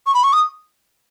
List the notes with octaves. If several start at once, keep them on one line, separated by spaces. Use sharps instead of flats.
C#6
B5
C#6
D#6